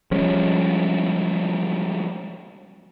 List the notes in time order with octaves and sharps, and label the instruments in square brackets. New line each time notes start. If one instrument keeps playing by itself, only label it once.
[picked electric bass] F3 G3 G#3 C#4